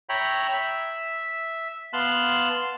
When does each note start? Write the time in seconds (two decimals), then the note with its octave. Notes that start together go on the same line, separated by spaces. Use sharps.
0.09 C#5 E5 G5 A#5 B5
0.54 E5
1.93 B3 F5 A5 C6 F#6